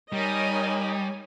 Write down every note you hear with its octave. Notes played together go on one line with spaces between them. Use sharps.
G3 D#4 A#4 C#5 D#5 G#5